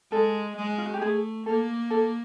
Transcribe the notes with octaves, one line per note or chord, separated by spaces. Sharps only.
G#3 A4
G#3
F4
F#4
G4
A3 G#4
A#3 A4
A4